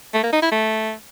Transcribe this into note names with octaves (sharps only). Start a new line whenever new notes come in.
A3
A#3
D#4
E4
A3